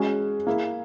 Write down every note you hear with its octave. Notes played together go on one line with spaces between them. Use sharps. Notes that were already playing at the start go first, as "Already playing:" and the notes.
Already playing: G#3 C#4 F#4
A#3 E4 G#4